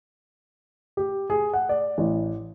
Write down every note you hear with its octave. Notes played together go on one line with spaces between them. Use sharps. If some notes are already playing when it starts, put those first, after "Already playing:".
G4
G#4
F#5
D5
A1